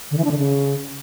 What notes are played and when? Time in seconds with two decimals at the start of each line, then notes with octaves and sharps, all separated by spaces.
0.11 D3
0.18 E3
0.24 D4
0.31 D3
0.38 C#3